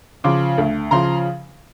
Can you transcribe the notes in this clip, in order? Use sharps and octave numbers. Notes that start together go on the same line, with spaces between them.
C#3 F3 C6 D6
D2
C#3 F3 A#5 C6